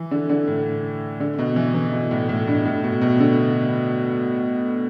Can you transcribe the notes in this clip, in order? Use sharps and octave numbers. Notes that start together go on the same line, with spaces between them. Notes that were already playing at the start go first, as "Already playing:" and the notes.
Already playing: E3
D3
D3
A2
D3
B2
E3
E3
B2
A2
A2
G2
A2
B2
B2
D3